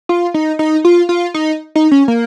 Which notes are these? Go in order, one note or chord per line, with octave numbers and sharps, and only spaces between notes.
F4
D#4
D#4
F4
F4
D#4
D#4
C#4
A#3